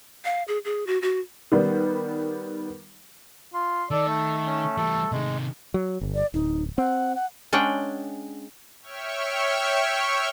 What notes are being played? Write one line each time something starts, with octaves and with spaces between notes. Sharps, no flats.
F5
G#4
G#4
F#4
F#4
D#3 G3 B3
F4 C6
D#3 A4 D5
A3
C#4
E3 G3 A4
C3 D#3 G#3
F#3
G1
D5
D1 D#4
C4 F#5
F#5
G#3 C#4 D4 F#5 G5
C#5 E5 G5 C#6 F6